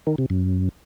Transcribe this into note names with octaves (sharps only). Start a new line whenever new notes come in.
D#3
C3
F#2